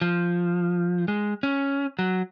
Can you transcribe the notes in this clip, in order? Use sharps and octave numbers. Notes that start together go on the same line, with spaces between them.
F3
G#3
C#4
F#3